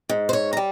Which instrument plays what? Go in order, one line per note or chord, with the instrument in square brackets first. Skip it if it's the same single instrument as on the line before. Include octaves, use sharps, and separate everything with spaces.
[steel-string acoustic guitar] G#2
C5
C#5
A#5
G3